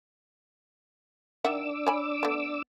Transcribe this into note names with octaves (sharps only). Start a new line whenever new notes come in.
D#3 D4 E5 F#5 D6 E6
C#5 G#5 B5
A3 B3